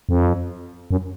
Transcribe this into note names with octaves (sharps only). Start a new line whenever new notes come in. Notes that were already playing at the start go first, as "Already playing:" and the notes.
F2
F#2